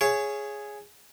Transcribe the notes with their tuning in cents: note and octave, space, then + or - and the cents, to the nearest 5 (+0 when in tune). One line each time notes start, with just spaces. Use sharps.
G#4 +0 C#5 +0 F5 -40